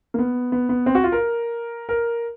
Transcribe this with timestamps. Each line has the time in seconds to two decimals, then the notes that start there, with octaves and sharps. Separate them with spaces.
0.14 A#3
0.19 B3
0.52 B3
0.69 B3
0.86 C4
0.95 F#4
1.04 F4
1.12 A#4
1.89 A#4